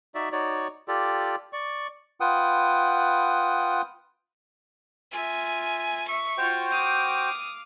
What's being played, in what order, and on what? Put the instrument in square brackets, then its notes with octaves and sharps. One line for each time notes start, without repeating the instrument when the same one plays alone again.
[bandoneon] D#4 F#4 D5 E5
D#4 F#4 C#5 D5
F4 G4 A4 D5
D5 C#6
[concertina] F4 B4 F#5 G5 D#6
[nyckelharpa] F4 E5 [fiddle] G#5
[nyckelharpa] E5 [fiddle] C#6
[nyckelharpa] F4 [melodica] F#4 C5 G5
[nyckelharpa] F5 D6 [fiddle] D#6